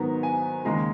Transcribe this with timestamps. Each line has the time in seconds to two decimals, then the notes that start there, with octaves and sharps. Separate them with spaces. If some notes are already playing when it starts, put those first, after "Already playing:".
Already playing: G#2 D#3 F#3 B3 A#5
0.23 G#5
0.65 D#2 C#3 G#3 A#5